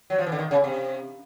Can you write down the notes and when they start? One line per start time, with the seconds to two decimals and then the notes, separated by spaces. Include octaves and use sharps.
0.10 F#3
0.18 F3
0.27 E3
0.32 D3
0.39 D#3
0.51 C#3
0.64 C3